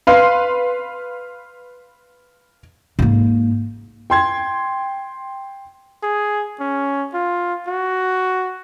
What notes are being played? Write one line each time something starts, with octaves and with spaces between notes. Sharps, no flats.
B4 F5 C6
G#2 A#3
G5 C6 G#6
G#4
C#4
F4
F#4